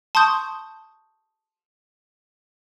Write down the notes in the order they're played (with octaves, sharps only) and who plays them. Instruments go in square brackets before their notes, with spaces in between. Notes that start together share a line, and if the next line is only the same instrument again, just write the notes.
[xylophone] A5 C6 C#6 D#6 G6